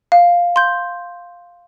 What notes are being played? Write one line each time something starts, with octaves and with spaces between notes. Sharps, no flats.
F5
C6 G6